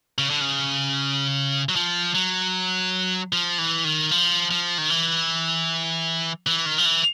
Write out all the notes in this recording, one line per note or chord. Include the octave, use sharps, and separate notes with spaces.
C#3
D3
C#3
F#3
F3
F#3
F3
E3
D#3
F3
F3
D#3
E3
E3
D#3
F3
E3